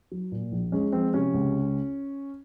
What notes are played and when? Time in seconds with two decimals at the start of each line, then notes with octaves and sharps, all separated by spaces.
0.12 F#3
0.32 A#2
0.52 A#1
0.72 G#3 C#4
0.92 F3 C4
1.14 C3 C#4
1.34 C#2